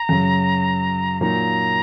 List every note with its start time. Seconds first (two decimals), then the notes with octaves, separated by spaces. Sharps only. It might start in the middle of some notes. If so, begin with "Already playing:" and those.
Already playing: A#5
0.09 F#2 C#3 F#3
1.21 A#2 F#3 A#3 D#4 A#5